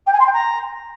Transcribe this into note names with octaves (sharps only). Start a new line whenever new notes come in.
G5
G#5
C6
G5
A#5